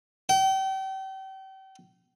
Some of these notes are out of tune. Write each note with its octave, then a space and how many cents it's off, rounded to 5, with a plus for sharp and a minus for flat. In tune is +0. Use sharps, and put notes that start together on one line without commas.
G5 -35